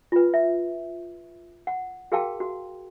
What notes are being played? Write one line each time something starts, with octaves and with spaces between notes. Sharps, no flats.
F4 B4
E5
F#5
F#4 G#4 A#4 F5 G5 A5
F#4